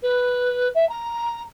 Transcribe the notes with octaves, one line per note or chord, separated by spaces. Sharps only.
B4
E5
A#5